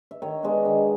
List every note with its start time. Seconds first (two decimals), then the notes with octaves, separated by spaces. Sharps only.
0.11 E5
0.22 D#3 C#5 D#5
0.43 G#3 B3 D4
0.65 D#3